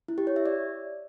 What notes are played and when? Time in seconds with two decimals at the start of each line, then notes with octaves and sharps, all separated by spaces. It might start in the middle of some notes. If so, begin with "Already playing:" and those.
0.08 E4
0.18 G4
0.27 C#5
0.36 E5
0.46 D5